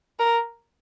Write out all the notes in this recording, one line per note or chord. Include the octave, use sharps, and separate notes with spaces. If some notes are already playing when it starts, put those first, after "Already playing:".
A#4